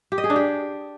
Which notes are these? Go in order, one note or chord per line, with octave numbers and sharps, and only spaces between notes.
G4
D#5
G#4
D4
G4